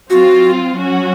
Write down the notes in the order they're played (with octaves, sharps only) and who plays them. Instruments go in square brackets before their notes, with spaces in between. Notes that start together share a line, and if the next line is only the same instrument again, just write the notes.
[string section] F#3 C4 F4 [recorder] F#4
[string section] F#3 C#4 F#4